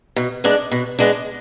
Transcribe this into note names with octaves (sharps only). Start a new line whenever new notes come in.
B2
G#3 B3 D4
B2
G#3 B3 D4